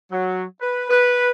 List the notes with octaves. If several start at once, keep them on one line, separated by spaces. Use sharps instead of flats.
F#3
B4
B4